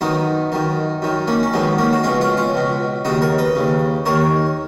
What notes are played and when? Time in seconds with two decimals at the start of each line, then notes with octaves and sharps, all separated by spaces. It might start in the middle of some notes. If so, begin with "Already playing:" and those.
0.01 F#2 D#3 B3 D#4
0.52 F#2 D#3
1.02 F#2 D#3
1.28 A#3 C#4
1.43 C#4
1.53 F#2 D#3 G#3 B3
1.78 A#3 C#4
1.93 F#4
2.03 C#2 B2 C#4 F4
2.21 C#4 F4
2.37 C#4 F4
2.54 C#2 B2
3.05 D#2 C#3 D#4 F#4
3.22 A#4 C#5
3.38 B4 D#5
3.55 D#2 C#3
4.05 D#2 D#3 A#4 C#5